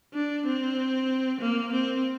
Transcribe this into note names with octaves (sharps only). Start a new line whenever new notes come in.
D4
C4
A#3
C4